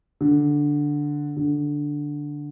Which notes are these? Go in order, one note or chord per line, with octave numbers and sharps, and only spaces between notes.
D3
D3